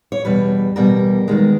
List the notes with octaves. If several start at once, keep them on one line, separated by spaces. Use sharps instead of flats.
C#5
E2 B2 G3 B4
E2 B2 G3 A#4
E2 D#3 G#3